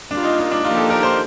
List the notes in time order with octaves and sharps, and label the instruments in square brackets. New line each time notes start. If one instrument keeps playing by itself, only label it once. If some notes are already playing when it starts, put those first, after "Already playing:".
[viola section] G3 A#3 F4 [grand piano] D4
[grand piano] D#4
D#4
D4
[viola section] F3 A#3 D#4 G4 [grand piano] F4
[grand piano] A4
A#4
C5